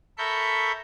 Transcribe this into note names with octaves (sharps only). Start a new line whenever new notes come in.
A4 A#4 E5 B5 C#6 G6